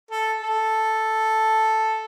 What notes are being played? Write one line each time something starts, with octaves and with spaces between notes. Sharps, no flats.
A4
A4